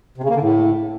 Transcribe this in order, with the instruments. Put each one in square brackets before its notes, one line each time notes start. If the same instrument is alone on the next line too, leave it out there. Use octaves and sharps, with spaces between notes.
[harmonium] C3
C#3
A#3
D3
A2